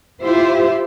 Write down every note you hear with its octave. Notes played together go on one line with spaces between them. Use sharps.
E4 F4 G4 C5 E5